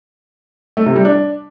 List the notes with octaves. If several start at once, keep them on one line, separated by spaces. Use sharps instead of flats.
A3
C3
G3
D4